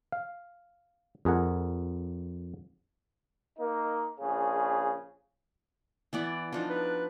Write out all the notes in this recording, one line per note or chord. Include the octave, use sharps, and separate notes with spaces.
F5
F2 G#4 A#4 F#5
A#3 D#4
A#1 C#3 G#4
E3 B3 D5
F3 D4 D#4
B4